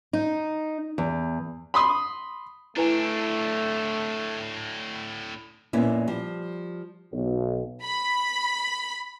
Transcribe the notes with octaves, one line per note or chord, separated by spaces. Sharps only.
D#4
E2
B5 C6 D#6
A2 A3 D4 E4 B4 G#5
F2 A#2 A#3 B3 C#4 E4
F3 G3
B1
B5